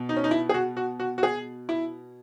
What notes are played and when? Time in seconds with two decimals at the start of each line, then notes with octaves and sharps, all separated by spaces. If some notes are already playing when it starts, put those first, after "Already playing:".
Already playing: B2
0.09 D#4
0.16 C#4
0.24 D#4
0.31 E4
0.49 G#4
0.54 F#4
0.77 F#4
1.00 F#4
1.18 F#4
1.23 G#4
1.69 E4